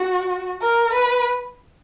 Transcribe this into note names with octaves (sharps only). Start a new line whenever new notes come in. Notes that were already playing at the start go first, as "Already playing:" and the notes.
Already playing: F#4
A#4
B4